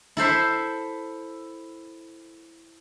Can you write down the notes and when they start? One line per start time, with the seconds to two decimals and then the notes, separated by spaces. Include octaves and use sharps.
0.17 E4 A4 C5 E5